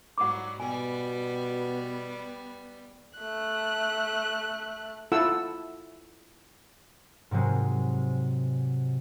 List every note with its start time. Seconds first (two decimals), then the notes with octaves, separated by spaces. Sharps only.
0.18 G#2 F#3 G3 F#5 D6
0.60 B2 G3 B3 G#5
3.18 A3 F#6
5.12 E4 F4 A4 F#5 E6
7.31 G#2 C3 F#3 G#3